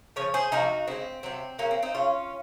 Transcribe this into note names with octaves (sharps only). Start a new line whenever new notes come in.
C#3 F3 C#5
G#4 C5
C3 F3 G#3 D#4 F#4
C#3 G#3 C4
C3 F#3 C4
C#3 F#3 A#3 C#4
C4
C4 D#4
C#3 F#3 C#4 F4